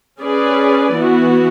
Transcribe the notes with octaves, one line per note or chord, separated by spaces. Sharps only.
C#4 G#4 B4 D5
E3 B3 F#4